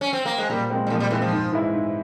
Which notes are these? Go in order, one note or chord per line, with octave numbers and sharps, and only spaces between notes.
C#4
C4
A#3
G#3
A#2 G3
G#3 C4
G3
A#2 F3
G3
E3 G#3 C4
F3
G#2
E3 G#3 E4
G#2